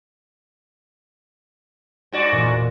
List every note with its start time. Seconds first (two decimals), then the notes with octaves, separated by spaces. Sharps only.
2.12 G#2 F#4 D5
2.31 E1 A#2 A#6